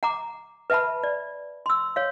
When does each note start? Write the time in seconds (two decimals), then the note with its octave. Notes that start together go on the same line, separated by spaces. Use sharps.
0.03 F#5 A#5 D6
0.70 B4 E5 F#5 A5 B5
1.04 D5
1.66 C6 E6
1.96 C#5 F5